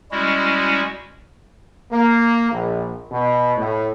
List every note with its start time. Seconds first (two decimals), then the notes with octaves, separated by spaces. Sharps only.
0.11 G3 G#3 C#4 E4 F#4
1.91 A#3
2.50 A#1
3.10 B2
3.57 A2